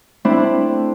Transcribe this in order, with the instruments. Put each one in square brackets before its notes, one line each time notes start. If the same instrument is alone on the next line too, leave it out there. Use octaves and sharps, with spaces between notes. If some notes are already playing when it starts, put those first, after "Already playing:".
[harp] A3 C4 D4 E4